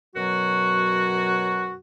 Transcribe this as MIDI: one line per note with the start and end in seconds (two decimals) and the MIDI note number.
0.16 1.75 42
0.16 1.75 47
0.16 1.75 54
0.16 1.75 66